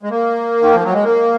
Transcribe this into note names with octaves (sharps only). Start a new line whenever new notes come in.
G#3
A#3
D#3
F3
F#3
G#3
A#3